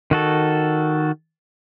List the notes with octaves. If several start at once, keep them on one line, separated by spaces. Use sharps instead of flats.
D#3 F#4 A4